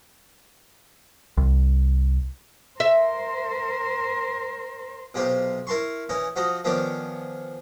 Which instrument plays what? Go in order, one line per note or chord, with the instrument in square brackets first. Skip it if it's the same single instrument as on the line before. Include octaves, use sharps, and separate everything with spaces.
[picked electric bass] C2
[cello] A#4 C5 [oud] E5
[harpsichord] B1 C3 F4 G4 C5
E4 A#4 A5 C6 C#6
E3 C#4 D#4
F3 F#4 D#5 A#5
D#3 F3 B3 C#4 D4 D6